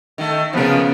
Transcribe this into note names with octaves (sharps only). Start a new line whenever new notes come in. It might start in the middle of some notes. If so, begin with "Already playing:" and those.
D#3 A3
C#3 F3 B3 A#4